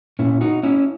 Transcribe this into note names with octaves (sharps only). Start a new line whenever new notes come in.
A#2 C#4 E4
D#4 F#4
C#4 E4